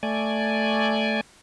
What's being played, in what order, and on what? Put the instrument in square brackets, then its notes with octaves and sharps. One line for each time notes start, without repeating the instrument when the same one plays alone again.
[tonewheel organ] A3 D5 G#5